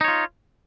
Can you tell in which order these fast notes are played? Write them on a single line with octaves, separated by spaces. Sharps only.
D#4 C#5 F4